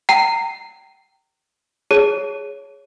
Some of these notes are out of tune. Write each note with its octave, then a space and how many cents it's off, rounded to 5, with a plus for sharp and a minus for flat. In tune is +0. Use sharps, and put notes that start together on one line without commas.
G5 -20 A#5 -25
G#4 +0 C#5 +0 A5 +0